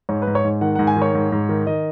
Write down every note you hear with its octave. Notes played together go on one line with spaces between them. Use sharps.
G#2 C#5
B4
G#2
C#5
G#2
D#3 F#5
G#2 F#5
G#5
D#3
C#5
G#2
G#2
D#3
D#3 D#5